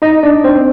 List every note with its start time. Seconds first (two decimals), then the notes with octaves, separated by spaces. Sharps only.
0.02 D#4 D#5
0.23 D4 D5
0.44 C4 C5